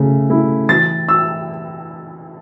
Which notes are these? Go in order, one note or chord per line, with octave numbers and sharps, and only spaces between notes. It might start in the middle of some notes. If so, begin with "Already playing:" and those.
Already playing: C#3 A3
A3 E4
E3 A6
E6